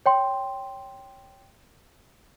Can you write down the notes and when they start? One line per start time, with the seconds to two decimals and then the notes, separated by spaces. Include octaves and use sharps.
0.06 C#5 G5 C6